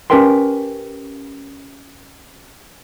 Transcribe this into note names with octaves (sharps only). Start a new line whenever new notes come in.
C#4 G4 A#4 B4 G5 C6